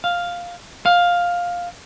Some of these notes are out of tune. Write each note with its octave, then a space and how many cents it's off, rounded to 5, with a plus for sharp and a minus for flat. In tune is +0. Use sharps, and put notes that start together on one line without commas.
F5 +5
F5 +10